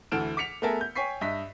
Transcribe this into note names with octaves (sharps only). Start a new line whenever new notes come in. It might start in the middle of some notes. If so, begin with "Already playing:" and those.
D2 E3 A4 F6 D7 E7
D6 B6 C#7 F7
A3 B3 G#4 A#4 E5 A5
G6
C#5 G5 G#5 C#6 B6 C7
G2 D#5 E5 B6